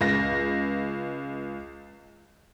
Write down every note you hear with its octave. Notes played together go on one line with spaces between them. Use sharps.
C#2 A#6